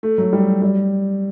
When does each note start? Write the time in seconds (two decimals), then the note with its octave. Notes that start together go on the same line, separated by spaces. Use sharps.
0.03 A3
0.18 F#3
0.33 G3
0.62 G3